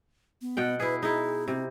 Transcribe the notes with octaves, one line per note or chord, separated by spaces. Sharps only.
B3
B2 F#5 G5
E4 G#4 B4
D#4 E4 G#4
C3 C4